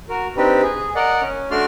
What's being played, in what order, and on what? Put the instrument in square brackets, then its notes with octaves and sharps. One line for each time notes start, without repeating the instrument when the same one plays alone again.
[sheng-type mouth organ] F#4 A#4
C4 D4 D#4 G4 B4
G#4
A#4 D5 D#5 F#5
C#4
A3 D4 F#4 D5 C6 F6